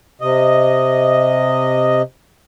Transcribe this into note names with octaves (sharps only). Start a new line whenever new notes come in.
C3 D#5